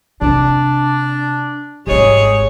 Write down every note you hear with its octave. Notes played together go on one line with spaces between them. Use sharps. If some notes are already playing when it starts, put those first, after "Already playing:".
C3 D4
D#1 G#1 G3 G#3 G#4 C#5